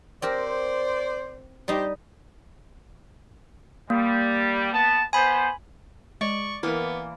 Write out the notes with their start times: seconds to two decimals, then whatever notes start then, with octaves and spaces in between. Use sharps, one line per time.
0.22 C4 G4 A#4 C5 D5
1.68 G3 D#4 G4 C5
3.90 G3 A#3
4.72 B3 A5
5.13 B3 C5 G#5 B5
6.21 G#3 D5 C#6
6.63 E3 A#3 B3 E4 A#4